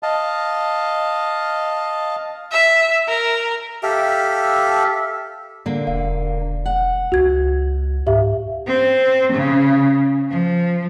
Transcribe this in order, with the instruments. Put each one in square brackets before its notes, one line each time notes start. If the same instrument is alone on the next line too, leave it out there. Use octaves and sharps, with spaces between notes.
[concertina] D#5 F5 A5
[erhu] E5
A#4
[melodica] G4 A4 E5 F5
[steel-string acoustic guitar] D3 A#3
[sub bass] E1 [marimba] F5
[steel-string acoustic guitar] F#5
[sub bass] C#2 [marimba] F#4 G#6
[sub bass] G#2 [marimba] G4 E5 F5
[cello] C4
C#3
F3